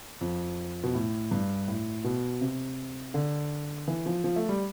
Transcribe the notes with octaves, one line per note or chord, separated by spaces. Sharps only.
F2
B2
A2
G2
A2
B2
C3
D3
E3
F3
F3
A3
G3